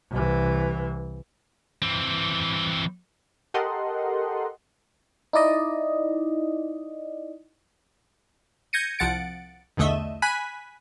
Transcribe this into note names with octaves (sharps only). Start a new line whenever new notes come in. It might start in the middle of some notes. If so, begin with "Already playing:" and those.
C2 E3
E3 C4
G4 A4 A#4 D#5 F#5 C6
D#4 E4 D5 D#5
G6 G#6 A#6 C#7 D#7
C2 F3 F#5 A6 C#7 D7
B1 E2 D3 A3 D#5 E5
G#5 B5 F#6 B6 D#7